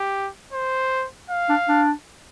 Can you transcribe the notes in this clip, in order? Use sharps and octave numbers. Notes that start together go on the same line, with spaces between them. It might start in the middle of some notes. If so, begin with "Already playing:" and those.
Already playing: G4
C5
F5
D4
D4